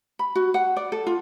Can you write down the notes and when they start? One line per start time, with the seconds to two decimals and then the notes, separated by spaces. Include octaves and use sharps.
0.19 B5
0.35 F#4
0.54 F#5
0.76 D5
0.92 A4
1.07 F4